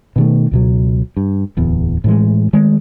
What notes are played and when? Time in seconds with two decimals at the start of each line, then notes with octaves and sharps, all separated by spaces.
0.16 B2 D#3 A3
0.51 C#2 B2 F#3
1.17 G2
1.57 D1 E2 B3
2.04 A2 E3 G#3
2.53 D#3 G#3 A3